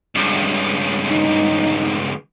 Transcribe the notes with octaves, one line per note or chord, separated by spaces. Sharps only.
C#2 G2
D#4